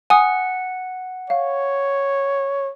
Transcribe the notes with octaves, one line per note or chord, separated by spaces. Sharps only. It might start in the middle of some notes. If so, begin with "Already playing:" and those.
F#5 G#5 D#6
C#5 F5